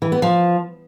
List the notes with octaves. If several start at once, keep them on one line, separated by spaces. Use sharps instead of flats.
E3
B3
F3